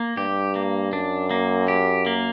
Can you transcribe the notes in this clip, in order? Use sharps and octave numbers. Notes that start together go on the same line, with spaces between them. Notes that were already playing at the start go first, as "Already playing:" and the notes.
Already playing: A#3
G2 G4
A#3
F#2 D4
A#3
G4
A#3